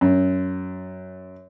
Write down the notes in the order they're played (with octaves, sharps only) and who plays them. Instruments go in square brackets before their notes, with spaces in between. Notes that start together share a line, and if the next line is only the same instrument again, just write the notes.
[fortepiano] F#2